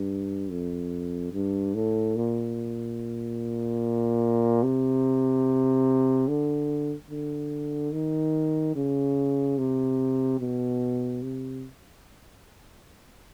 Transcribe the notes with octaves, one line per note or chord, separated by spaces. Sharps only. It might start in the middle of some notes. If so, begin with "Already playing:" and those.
Already playing: G2
F2
G2
A2
A#2
C3
D3
D3
D#3
C#3
C3
B2
C3